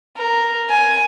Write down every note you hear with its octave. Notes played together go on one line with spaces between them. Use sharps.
A#4
G#5